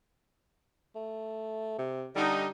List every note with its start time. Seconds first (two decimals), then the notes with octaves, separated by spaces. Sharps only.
0.95 A3
1.78 C3
2.15 D3 G3 D#4